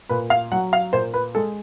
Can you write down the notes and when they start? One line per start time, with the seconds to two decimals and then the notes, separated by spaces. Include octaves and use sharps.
0.09 A#2 B4
0.30 F5
0.52 F#3 F#5
0.73 F5
0.93 A#2 C5
1.14 B4
1.35 G#3 A4